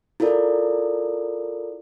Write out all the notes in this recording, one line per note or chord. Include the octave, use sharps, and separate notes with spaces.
E4 F4 A4 A#4 D5